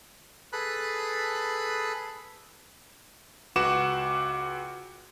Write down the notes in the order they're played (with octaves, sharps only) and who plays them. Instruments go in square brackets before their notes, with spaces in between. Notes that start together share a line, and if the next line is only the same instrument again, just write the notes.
[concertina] G#4 A4 B4 B5 F#6
[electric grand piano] C#2 F#4 B4 F#5 D6 E7